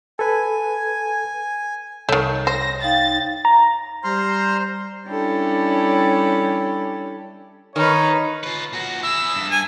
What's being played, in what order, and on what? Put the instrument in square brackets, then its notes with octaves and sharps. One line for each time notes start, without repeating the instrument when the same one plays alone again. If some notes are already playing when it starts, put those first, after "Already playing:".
[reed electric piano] A4 B4 [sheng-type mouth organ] G#5
[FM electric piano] C2 C#5 G6 [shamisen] D#3 A3
[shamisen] C5 [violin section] A#6
[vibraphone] D#4 F5 G5 [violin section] A6
[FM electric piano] A#5
[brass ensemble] G3 C5 [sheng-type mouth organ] A#5 C6 F6
[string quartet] G3 C#4 D4 E4 G4 A4
[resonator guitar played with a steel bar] D#3 [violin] D#4 B4 [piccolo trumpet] C#5
[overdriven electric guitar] F4 B4
A#2 F#4
[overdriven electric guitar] E4 G#4 [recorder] E6
[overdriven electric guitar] G2
[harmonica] G#5